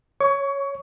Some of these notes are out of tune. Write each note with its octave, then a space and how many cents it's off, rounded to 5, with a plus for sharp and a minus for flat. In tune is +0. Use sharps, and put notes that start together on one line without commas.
C#5 +0 C#6 +25